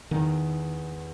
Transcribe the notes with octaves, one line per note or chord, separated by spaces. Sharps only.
E2 D#3